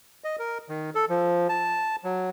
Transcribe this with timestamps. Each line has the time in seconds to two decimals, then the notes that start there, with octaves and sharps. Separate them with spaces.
0.24 D#5
0.39 A#4
0.69 D#3
0.95 A4
1.09 F3
1.49 A5
2.04 F#3